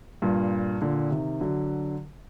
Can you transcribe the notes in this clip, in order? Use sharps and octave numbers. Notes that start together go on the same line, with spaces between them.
G2 A#2
A#2 D3
C3 D#3
D3 F#3